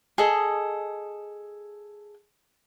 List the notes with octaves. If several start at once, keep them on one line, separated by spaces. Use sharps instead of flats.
G#4 A4 D#5